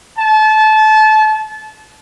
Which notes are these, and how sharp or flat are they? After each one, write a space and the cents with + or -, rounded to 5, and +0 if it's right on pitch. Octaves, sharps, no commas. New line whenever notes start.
A5 -25